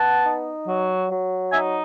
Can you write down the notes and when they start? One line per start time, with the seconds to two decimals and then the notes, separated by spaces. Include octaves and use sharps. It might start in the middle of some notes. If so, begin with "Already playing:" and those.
Already playing: B3 F#5 A5
0.25 D#4
0.67 F#3
1.11 F#3
1.53 D#4 E5 G#5